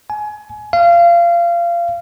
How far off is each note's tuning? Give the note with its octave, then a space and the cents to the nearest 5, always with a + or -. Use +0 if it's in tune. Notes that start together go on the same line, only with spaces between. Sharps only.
G#5 +25
F5 -25